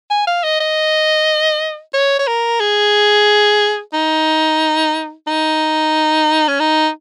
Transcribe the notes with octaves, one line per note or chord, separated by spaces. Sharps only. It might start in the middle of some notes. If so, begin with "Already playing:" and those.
G#5
F5
D#5
D#5
C#5
C#5
A#4
G#4
D#4
D#4
C#4
D#4